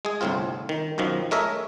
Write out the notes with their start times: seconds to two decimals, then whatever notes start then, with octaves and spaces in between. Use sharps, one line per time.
0.05 G#3 G#4
0.21 G1 C2 A2 C4 F4
0.69 D#3
0.98 B1 F#2 D#3 F3
1.31 G#3 A3 A#4 C#5 D#5 E5